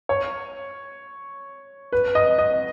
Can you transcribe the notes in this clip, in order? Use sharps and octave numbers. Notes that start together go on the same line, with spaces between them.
C#5
B4
D#5
D#5